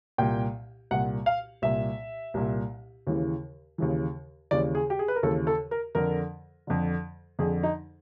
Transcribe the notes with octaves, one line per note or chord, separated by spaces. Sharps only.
C2 A#2 G5
C2 A#2 F#5
F5
C2 A#2 E5
C2 A#2
D#2 C#3 E3
D#2 C#3 E3
D#2 C#3 E3 D5
G#4
G4
G#4
B4
A#4
D#2 C#3 E3 A4
A4
A#4
F2 D3 A#4
F2 D3
F2 D3 G#4
D#4